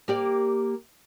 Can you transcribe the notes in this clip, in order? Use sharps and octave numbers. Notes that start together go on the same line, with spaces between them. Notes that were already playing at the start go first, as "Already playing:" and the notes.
A#3 G4 D5